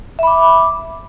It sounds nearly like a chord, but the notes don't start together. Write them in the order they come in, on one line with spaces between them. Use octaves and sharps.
E5 B5 D6